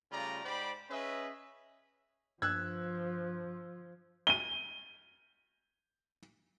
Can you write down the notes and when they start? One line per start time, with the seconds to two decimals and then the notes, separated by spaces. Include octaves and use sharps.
0.12 C#3 G3 A3 F4 D5 A#5
0.44 G#2 C5 D5 G5 B5
0.90 C#4 G#4 B4 D#5 E5
2.42 G2 F3 E6 F#6 G#6
4.27 D#7 G7